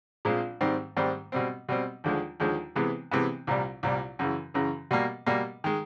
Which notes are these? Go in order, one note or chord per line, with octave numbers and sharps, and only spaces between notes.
A#1 A#2 F3 G#3 C4
G#2 D#3 G3 C4
G#2 D#3 G3 C4
B2 G3 C4
B2 G3 C4
D#2 D3 F3 G#3
D#2 D3 F3 G#3
C3 E3 G#3 B3
C3 E3 G#3 B3
C2 A#2 G3
C2 A#2 G3
F#2 C#3 E3
F#2 C#3 E3
B2 G3 A#3
B2 G3 A#3
D#3 G#3